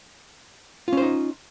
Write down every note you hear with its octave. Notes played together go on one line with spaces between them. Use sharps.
C#4 D#4 F4 C5